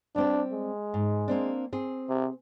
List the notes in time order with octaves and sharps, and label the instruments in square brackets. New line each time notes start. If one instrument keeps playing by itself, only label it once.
[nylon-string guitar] G3 C4 G4 [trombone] D4
[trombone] G#3
[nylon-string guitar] G#2
A#3 C4 D4
C4 G#4
[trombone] C3